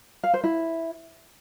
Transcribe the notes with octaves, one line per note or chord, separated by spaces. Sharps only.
F5
C5
E4